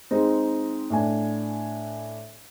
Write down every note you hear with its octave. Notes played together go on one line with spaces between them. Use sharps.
G#3 C4 D#4
A2 D4 G#5